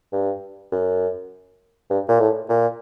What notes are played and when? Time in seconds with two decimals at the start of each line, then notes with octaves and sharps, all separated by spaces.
0.13 G2
0.72 F#2
1.90 G2
2.08 A#2
2.20 A2
2.49 A#2